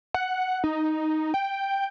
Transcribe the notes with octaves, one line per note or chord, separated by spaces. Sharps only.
F#5
D#4
G5